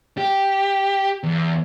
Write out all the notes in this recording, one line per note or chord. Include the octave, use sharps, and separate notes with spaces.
G4
E2